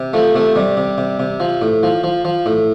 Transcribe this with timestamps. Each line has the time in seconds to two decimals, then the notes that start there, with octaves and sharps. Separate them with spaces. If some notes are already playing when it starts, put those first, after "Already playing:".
Already playing: C3
0.13 F3 A3
0.35 C3 A3
0.55 C3 G3
0.77 C3
0.98 C3
1.20 C3
1.40 F3
1.61 A2
1.83 F3
2.04 F3
2.25 F3
2.46 A2